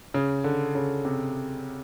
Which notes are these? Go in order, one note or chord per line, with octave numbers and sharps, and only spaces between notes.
C#3
D3
C#3
C3